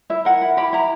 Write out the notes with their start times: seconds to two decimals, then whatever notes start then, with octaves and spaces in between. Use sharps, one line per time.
0.10 E4 E5
0.25 A#4 F#5
0.42 E4
0.57 G4 B5
0.73 E4 A#5